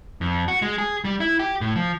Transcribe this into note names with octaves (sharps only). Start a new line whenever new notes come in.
F2
F#4
G#3
G#4
G3
E4
G4
A2
F3